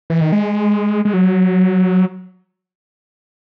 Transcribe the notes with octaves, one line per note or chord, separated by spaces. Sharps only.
E3
D#3
G#3
G#3
F#3